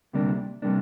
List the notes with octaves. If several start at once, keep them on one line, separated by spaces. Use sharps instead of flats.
D2 C3 G3 A#3 D4
C3 G3 A#3 D4